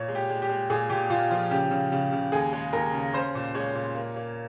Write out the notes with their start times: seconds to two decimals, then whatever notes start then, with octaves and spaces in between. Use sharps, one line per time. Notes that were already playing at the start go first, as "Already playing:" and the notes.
Already playing: A#2 C#5
0.08 G#3
0.15 G4
0.29 G#3
0.42 G4
0.49 G#3
0.70 A#2 G#4
0.90 A#2 G4
1.10 A#2 F4
1.31 F3 F4
1.51 C#3 G4
1.71 C#3
1.92 C#3
2.13 C#3
2.32 D#2 G#4
2.53 G#3
2.73 D#2 A#4
2.93 C#3
3.13 C#4 C5
3.35 A#2
3.54 G#3 C#5
3.75 A#2
3.95 A#3
4.16 A#3